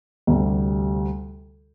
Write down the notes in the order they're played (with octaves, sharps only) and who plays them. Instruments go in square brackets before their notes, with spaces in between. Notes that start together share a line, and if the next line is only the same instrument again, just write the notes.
[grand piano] D2 C3 G3